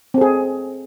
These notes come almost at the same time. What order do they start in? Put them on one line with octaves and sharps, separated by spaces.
C4 A4 G#4